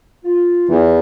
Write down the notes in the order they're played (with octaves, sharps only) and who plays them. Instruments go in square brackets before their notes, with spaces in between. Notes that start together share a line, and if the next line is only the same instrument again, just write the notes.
[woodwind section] F4
[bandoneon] E2 [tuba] E3